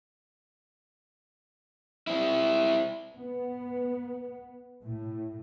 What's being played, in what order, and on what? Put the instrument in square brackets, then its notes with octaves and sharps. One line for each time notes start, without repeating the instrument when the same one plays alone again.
[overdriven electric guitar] C4 E4
[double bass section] B3
A2